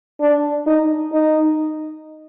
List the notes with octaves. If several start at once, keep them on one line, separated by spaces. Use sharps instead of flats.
D4
D#4
D#4